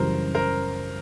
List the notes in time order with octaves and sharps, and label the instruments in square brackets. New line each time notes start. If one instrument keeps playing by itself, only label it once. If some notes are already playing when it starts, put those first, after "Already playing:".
Already playing: [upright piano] F#2 C#3 E3 G3 [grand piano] A#4 C5
[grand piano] A#4 C5